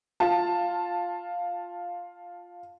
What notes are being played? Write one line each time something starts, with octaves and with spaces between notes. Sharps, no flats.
F4 A5